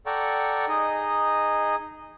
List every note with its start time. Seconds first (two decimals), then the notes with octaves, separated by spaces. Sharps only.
0.06 A4 D5 F#5 G5 A#5 C#6
0.68 D#4 G#4 D#5